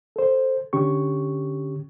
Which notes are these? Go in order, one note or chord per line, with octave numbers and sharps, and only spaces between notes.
A4 C5
D3 C#4 G4 C#6